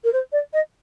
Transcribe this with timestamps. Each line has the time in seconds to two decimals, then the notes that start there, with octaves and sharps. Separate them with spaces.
0.04 A#4
0.12 C5
0.32 D5
0.53 D#5